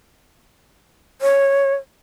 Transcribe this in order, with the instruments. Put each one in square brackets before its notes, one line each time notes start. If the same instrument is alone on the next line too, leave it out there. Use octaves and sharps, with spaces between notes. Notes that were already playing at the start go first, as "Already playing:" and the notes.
[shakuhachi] C#5